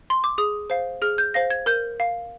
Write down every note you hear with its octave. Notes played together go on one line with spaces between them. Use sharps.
C6
D6
G#4 D#6
C5 F5
G#4 F6
G6
C5 F5 A#6
G#6
A#4 G6
F5